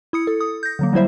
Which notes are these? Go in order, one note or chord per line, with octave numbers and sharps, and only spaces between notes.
E4 D#6 C#7
A4
D#6
G6 A#6
D3 F#3 A#3
F#3 G3 E4 C5 E5